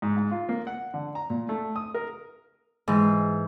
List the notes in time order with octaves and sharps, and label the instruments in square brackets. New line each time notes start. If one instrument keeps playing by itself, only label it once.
[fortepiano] G#2
G#2
F4
A#3
F#5
D3
A#5
A#2
A3
D#6
A#4
[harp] G#2 E3